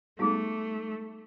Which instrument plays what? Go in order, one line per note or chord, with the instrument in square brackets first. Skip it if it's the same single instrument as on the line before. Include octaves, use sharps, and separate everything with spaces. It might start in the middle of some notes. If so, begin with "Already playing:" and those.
[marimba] G3 B3 D#4 [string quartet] A3 [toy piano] G4 G#4